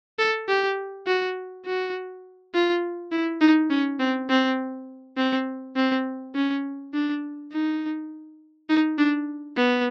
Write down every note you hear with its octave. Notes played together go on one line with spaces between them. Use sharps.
A4
G4
F#4
F#4
F4
E4
D#4
C#4
C4
C4
C4
C4
C#4
D4
D#4
D#4
D4
B3